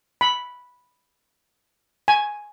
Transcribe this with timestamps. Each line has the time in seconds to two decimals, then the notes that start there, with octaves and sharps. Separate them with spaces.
0.21 B5
2.08 G#5